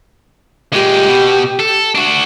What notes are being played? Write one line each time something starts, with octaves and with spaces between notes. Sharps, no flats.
A#2 G#3 G4
B2
A4
D4 F#4